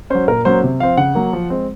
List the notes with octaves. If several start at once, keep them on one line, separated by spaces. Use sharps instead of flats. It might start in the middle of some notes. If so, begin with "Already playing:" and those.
F#3 C#4 C5
A#2 A#4
F#3 A#3 C#4 C5
C3
F3 C4 F5
C#3 F#5
F#3 A#3
F3
G#3 C4